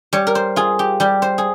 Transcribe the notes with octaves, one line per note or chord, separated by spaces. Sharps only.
G3 C#5
A#4
C5
F4 G#4
G4
G3 G4
C5
G#4